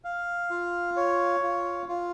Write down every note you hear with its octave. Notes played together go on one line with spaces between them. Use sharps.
F5
F4
C#5
F4
F4